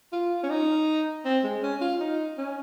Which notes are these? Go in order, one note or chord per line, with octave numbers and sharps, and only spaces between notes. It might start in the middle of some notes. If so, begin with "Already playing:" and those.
F4
C#4
D#4
C4
G#3
C#4
F4
D#4
C#4